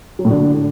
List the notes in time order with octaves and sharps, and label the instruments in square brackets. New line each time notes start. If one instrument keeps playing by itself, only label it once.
[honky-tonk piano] F#3
A2
D3